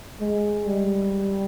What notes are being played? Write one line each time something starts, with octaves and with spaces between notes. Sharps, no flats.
G#3
G3